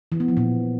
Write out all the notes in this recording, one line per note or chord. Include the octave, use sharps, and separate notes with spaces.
E3
B3
F3
A#2